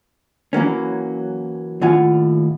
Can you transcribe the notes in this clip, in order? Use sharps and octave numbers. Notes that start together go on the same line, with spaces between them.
E3 F#3 A#3 C#4
D#2 A2 F4 F#5 G#5